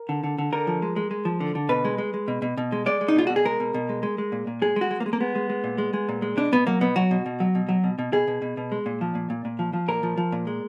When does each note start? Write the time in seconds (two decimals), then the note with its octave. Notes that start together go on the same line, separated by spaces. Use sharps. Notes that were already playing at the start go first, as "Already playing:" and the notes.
Already playing: A#4
0.09 D3
0.24 D3
0.38 D3
0.52 D3 A#4
0.67 F3
0.82 G#3
0.96 G#3
1.11 G#3
1.25 F3
1.40 D3
1.55 D3
1.69 B2 B4
1.85 G#3
1.98 G#3
2.14 G#3
2.28 B2
2.42 B2
2.57 B2
2.72 G#3
2.86 G#3 D5
3.01 G#3
3.08 D#4
3.16 B2 F4
3.27 B2 F#4
3.36 G#4
3.45 G#3 A#4
3.60 B2
3.74 B2
3.89 G#3
4.03 G#3
4.18 G#3
4.32 A#2
4.47 A#2
4.62 G#3 G#4
4.76 G#3 F#4
4.91 G#3
5.00 A#3
5.06 G#3
5.13 A#3
5.20 G#3 B3
5.35 G#3
5.50 G#3
5.64 A#2
5.78 G#3
5.93 G#3
6.09 A#2
6.22 G#3
6.37 B2 D4
6.52 B2 B3
6.67 F#3 A#3
6.81 B2 B3
6.96 F#3 F#4
7.11 B2
7.26 B2
7.40 F#3
7.55 B2
7.69 F#3
7.84 B2
7.99 B2
8.13 B2 G#4
8.27 B2
8.42 B2
8.57 B2
8.72 G#3
8.86 A#2
9.01 F3
9.15 A#2
9.30 A#2
9.45 A#2
9.59 F3
9.73 F3
9.88 A#2 A#4
10.03 F3
10.17 F3
10.32 A#2
10.47 G#3